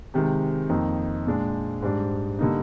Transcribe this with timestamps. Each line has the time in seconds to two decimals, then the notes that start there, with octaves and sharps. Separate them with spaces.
0.14 C3 D#3 G#3
0.69 F2 D#3 A#3 D#4
1.26 A#2 G#3 D4
1.82 G#2 G3 D4
2.39 D3 G3 A#3 D#4